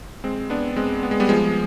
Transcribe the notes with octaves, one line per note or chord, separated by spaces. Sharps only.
G#3 C4
B3 D4
G#3 C4
B3
G#3
G3 B3
F3 G#3